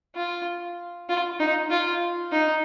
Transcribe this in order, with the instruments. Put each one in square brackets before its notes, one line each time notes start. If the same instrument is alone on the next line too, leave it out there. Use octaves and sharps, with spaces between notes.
[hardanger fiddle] F4
F4
D#4
F4
D#4